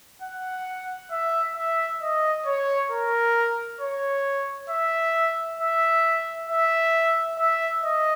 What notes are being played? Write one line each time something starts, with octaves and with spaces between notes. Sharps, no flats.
F#5
E5
E5
D#5
C#5
A#4
C#5
E5
E5
E5
E5
D#5